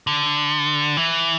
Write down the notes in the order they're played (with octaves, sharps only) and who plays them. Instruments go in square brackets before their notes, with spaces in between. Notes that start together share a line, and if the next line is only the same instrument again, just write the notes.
[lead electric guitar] D3
E3